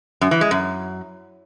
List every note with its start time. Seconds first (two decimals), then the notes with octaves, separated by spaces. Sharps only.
0.21 F#2
0.31 E3
0.41 G#3
0.51 F#2